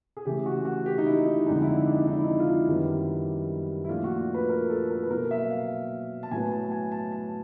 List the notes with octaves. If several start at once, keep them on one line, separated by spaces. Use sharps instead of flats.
G#4
C#3 E3 A3 G4
F#4
F#4
G4
D#4
E4
D#4
F2 D3 F3 G#3 D#4
E4
D#4
D4
D#4
D#4
E4
D#4
F4
E4
F#2 D#3 G3 B3 D4
E4
A#2 F3 A3 D4 F4
F#4
B4
A#4
A4
A#4
B4
B2 F#3 A#3 A#4
E5
F5
A5
A2 F#3 B3 G#5
A5
G#5
A5
A5